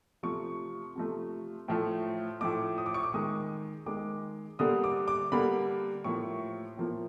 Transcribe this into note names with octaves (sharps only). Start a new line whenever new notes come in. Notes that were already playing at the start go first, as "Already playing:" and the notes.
C3 F3 A3 C#6
C3 F3 A3
A2 F3 A3
A2 F3 A3 D6
D#6
D6
C#6
D6
D#3 G#3 D#6
D#3 G#3 D6
D3 G3 A#3 D#6
D6
D6
D3 G3 A#3 B5
A2 F3 A#3 C#6
A2 F3 A#3